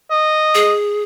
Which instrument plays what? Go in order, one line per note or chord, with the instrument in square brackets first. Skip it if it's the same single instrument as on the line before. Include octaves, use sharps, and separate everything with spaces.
[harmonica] D#5
[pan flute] G#4